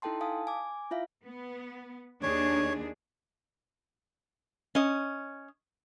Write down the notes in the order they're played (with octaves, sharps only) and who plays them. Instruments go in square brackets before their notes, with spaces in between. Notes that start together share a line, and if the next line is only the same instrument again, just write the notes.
[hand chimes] D#4 E4 A4 G5 A5 C6
F5 G#5 A5 D#6
G#5 D6
E4 F4 E5 F5
[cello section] B3
[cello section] D#2 D4 G#4 [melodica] C#5
[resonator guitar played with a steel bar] C#4 D#5